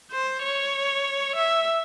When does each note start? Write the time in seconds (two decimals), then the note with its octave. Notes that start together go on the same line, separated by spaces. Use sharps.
0.12 C5
0.43 C#5
1.36 E5